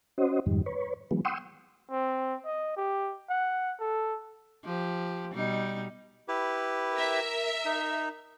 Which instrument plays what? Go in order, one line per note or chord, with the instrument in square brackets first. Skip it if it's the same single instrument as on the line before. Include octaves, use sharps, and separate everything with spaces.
[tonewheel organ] C#4 F#4 C5 D#5
F2 G#2 D#3 G3
B4 C#5
E3 F#3 G#3 B3
F#5 G5 C6 C#6 D#6 E6
[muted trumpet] C4
D#5
G4
F#5
A4
[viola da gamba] F3 G4
B2 G3 D#4
[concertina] E4 G4 B4
[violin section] A#4 E5
[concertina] D#4